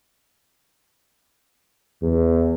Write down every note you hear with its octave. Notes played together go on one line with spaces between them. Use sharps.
E2